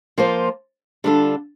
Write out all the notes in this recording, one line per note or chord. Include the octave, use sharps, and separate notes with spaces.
F3 A#3 F4 C5
D3 G3 D4 F4 A4